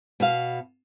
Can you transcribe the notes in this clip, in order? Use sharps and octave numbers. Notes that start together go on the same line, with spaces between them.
B2 F5